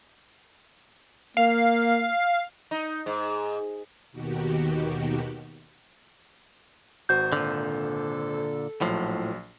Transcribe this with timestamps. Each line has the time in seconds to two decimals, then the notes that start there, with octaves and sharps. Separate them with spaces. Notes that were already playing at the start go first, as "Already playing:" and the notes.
1.37 A#3 F5
2.71 D#4
3.06 G#2
4.12 D#2 B2 D#3 F#4 G4
7.09 G#1 F#4 C5 G6
7.32 A#2 D3 A4
8.81 A#1 A2 F3 F#3 C7